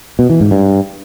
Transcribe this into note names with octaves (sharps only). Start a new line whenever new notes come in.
B2
E3
G#2
G2